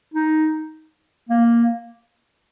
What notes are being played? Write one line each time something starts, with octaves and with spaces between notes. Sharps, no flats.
D#4
A#3